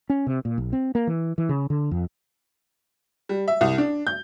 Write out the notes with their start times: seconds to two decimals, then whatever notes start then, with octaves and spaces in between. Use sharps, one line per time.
0.10 C#4
0.27 C3
0.45 A#2
0.58 B1
0.73 C4
0.95 A#3
1.07 E3
1.38 E3
1.49 C#3
1.70 D3
1.91 F2
3.29 G3
3.48 E5
3.61 C2
3.78 D4
4.07 G6